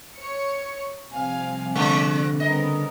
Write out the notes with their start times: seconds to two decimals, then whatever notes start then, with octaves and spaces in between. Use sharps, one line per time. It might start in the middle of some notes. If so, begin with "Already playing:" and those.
0.16 C#5 C#7
1.12 C3 F3 G3 F5 G#5
1.75 D3 G#3 D5
2.40 C#3 G3 B3 C4 A#4 D#5